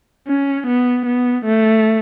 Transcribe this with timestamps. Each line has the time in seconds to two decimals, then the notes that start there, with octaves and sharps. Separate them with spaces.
0.27 C#4
0.67 B3
1.06 B3
1.45 A3